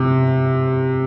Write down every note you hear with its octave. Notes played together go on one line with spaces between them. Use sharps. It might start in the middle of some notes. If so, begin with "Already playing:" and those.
Already playing: C3